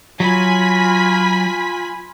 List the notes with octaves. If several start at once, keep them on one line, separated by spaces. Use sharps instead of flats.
F#3 F4 G#5 B5 B6